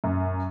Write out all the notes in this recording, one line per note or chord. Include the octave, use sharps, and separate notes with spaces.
F#2